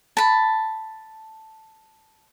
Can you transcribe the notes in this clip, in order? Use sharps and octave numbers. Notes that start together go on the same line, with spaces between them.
A5 B5